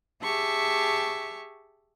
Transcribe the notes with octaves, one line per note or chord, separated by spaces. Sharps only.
G4 G#4 E5 A5 C#6